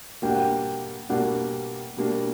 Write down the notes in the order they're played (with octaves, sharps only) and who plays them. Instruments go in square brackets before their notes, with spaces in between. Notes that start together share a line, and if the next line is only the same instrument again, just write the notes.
[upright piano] B2 G3 A#3 D4 [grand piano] G5
[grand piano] F#5
G5
[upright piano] B2 G3 A#3 D4 [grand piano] F#5
[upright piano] B2 G3 A#3 D4